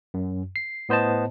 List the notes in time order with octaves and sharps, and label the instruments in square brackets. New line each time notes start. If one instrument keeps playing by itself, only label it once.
[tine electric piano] F#2
C7
A2 B3 C5 D#5 A5